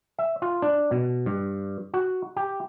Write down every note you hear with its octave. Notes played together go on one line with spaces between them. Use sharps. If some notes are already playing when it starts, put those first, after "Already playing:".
E5
F4
D4
B2
G2
F#4
G4